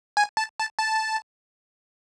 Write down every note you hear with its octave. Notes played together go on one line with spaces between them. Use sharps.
G#5
A5
A5
A5